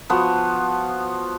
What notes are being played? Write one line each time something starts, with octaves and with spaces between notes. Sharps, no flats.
F3 B3 F#4 F#5